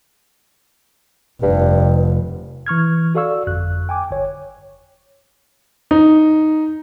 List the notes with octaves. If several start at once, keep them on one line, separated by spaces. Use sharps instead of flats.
F1 G2
E3 C#6 F6 G#6
F#4 A4 D5 F5 C#6 E6
G1 F2 F#6
G5 G#5 D6
G1 C#5
D#4